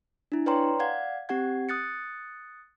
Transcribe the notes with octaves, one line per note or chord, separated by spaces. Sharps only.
D4 E4
B4 C#5 D5 G5 A#5 C6
D5 F5 F#5 G#6
C4 G4 F#5 G#6
D#6 F#6 A6 C#7